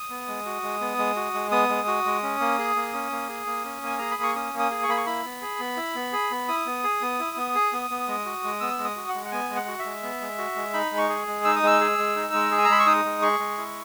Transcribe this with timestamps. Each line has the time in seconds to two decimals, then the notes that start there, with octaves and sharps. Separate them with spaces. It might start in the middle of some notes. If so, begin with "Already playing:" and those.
Already playing: D#6
0.09 B3
0.27 G#3
0.46 F#4
0.63 G#3
0.81 B3
0.98 G#3
1.16 F#4
1.34 G#3
1.51 B3 D#6
1.69 G#3
1.87 F#4
2.05 G#3
2.23 C#4
2.40 A#3
2.58 G#4
2.76 A#3
2.93 C#4
3.12 A#3
3.29 G#4
3.46 A#3
3.65 C#4
3.82 A#3 G#5
3.98 G#4 A#5
4.11 B5
4.18 A#3
4.23 C#6
4.35 C#4 D#6
4.53 A#3
4.59 D#6
4.71 G#4
4.83 C#6
4.88 A#3 B5
4.97 C#6
5.06 E4 B5
5.25 B3
5.42 G#4
5.60 B3
5.77 E4
5.95 B3
6.13 G#4
6.31 B3
6.48 E4 D#6
6.66 B3
6.84 G#4
7.01 B3
7.19 E4
7.37 B3
7.55 G#4
7.73 B3
7.90 B3
8.08 G#3
8.26 F#4
8.44 G#3
8.60 B3 E6
8.79 G#3
8.85 D#6
8.96 F#4
9.09 F#5
9.14 G#3
9.25 F#5
9.32 B3 G#5
9.49 G#3
9.55 F#5
9.68 F#4
9.79 E5
9.85 G#3
10.03 B3
10.21 G#3
10.38 F#4
10.56 G#3
10.74 D#4 B5
10.92 G#3
10.98 C#6
11.09 G#4
11.27 G#3
11.44 D#4 E6
11.56 D#6
11.63 G#3 E6
11.81 G#4
11.98 G#3
12.16 D#4
12.34 G#3
12.51 G#4
12.58 G#5
12.65 A#5
12.69 G#3 B5
12.80 C#6
12.86 D#4 D#6
13.05 G#3
13.22 G#4 C#6
13.39 G#3
13.57 E4